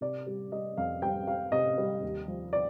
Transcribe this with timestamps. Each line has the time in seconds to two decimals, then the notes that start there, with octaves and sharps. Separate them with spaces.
0.01 C3 D5
0.27 G3
0.52 G3 D#5
0.77 F2 F5
1.02 G3 G5
1.27 G3 F5
1.52 C3 D#5
1.78 G3
2.03 D#2
2.28 F3
2.53 D5